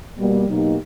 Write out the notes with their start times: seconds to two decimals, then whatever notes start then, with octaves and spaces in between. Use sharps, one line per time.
0.17 B2 G3 A#3
0.47 B2 F#3 A#3 D#4 G4